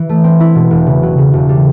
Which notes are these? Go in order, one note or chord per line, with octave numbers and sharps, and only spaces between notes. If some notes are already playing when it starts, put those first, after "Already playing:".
Already playing: E3
A3
C4
E4
B2
E1
C#3
F#3
C#3
E1
G3